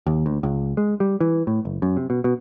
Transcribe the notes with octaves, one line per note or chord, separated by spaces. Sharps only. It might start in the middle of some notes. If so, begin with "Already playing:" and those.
D#2
D2
C#2
G#3
G3
E3
A2
F#1
F#2
C3
B2
B2